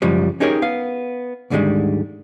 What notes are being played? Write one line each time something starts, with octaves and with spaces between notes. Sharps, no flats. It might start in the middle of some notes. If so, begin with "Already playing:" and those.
F#2 C#3 F3 G3 G#3
C#4 D#4 G4 G#4 A#4 C#5
B3 F5
D2 G#2 D3 D#3 G3 G#3